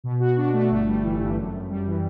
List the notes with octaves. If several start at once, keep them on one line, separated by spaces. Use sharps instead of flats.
B2
F#4
D4
A3
G1
G3
E3
G2
F#2
F#2
G3
E3